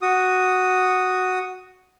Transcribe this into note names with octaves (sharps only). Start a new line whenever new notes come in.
F#4 D#6